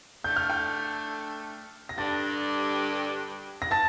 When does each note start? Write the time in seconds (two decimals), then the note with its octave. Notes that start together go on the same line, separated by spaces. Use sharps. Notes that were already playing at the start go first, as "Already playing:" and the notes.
0.24 A3 D4 A4 G6
0.36 F6
0.49 G5 G6
1.89 A#6
1.98 G2 D3 G3 D4 G4 A5 A6
3.62 A#6
3.71 A5 A6